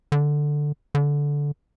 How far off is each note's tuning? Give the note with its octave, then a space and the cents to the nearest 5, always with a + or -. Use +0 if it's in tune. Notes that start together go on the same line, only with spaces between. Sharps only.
D3 +5
D3 -15